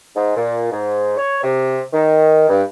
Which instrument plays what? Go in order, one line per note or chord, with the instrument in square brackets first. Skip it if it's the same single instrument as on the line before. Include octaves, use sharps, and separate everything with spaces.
[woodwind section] G#2
A#2
G#2
C#5
C3
D#3
G2